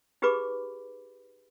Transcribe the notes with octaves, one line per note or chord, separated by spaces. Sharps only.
D#4 G4 G#4 B4 B5 D6